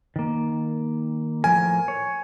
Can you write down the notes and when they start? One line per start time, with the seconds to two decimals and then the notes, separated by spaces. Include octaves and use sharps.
0.16 D#3 A#3
1.44 A2 F3 A#4 G#5
1.88 C#5